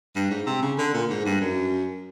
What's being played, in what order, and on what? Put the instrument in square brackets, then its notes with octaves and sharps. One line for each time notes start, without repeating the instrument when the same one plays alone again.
[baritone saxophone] G2
G#2
C3
C#3
D3
A#2
G#2
G2
F#2